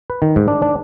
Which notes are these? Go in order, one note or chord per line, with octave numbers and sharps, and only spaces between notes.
B4
D#3
G#2
D4
D4